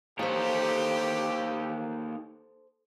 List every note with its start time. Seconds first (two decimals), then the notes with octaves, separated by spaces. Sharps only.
0.19 A#3 D#4 G4 A4 C5 C#5